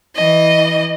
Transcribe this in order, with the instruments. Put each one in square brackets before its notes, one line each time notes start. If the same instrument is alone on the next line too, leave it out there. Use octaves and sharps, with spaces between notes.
[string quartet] E3 D#5